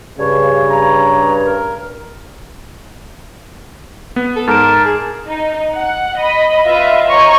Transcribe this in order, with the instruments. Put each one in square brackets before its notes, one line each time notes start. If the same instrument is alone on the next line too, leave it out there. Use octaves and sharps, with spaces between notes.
[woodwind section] G2 [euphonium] C#3 [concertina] C#5
[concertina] C#5 A#5
A#4
[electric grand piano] B3
[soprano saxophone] A4
[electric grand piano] G#2 D7 [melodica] A#4 [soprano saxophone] A5
[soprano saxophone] G#4
[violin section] D#4
F#5
D#5 B5
F4 B4 D#5 E5
C#5 D#5 A#5 C#6